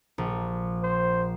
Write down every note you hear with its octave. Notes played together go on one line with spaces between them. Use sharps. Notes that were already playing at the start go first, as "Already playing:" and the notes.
A#1
C5